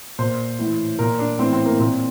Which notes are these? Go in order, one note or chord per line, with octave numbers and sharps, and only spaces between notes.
A#2 C5
A2 E3
A#2 A#4
D4
A2 E3 C4
C4
A#3
A#2 C4